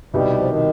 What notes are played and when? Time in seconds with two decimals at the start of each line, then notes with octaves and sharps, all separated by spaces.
0.14 C2 B2 G3 B3 D#4 G4
0.37 F3
0.48 D#3